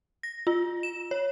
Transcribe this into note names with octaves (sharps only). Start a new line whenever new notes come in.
A#6
F4
E7
C#5